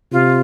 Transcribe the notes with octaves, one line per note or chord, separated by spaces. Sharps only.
C3 F4